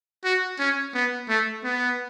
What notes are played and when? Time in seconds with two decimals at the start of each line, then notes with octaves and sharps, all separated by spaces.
0.24 F#4
0.59 C#4
0.94 B3
1.29 A3
1.64 B3